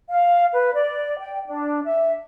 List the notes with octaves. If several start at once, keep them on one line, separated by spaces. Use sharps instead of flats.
F5
B4
D5
G5
D4
E5